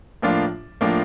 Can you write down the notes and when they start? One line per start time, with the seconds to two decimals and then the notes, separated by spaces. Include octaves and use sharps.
0.22 A2 F3 A#3 D4 F4
0.81 A2 F3 A#3 D4 F4